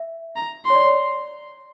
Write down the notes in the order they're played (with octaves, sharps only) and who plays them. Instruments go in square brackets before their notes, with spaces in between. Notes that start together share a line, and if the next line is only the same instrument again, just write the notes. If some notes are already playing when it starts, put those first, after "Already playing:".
Already playing: [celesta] E5
[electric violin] A#5
[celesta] C#5 [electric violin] C6
[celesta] D5
C#5